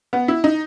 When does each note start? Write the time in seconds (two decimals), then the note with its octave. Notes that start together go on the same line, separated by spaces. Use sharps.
0.13 B3
0.28 E4
0.44 D#4